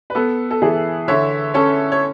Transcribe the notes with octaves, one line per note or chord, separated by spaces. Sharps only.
B4
B3 A4
A4
E3 G#4
D3 C#5 E5
C#4 A4 C#5
C#5